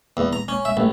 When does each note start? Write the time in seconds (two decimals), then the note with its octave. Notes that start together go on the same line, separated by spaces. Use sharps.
0.17 E2
0.33 A#5
0.48 C#4
0.65 E5
0.77 A1